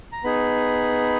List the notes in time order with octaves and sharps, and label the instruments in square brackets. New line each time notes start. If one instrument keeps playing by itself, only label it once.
[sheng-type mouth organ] A#5
B3 D#4 G#4 B5